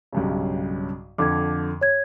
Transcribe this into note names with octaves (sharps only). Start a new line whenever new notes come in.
B1 G2 C#3
F2 D3 D6 G#6
C#5 G#6